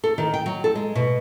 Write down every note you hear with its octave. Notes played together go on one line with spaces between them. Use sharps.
A4
D#3
G5
F#3
A4
G#3
B2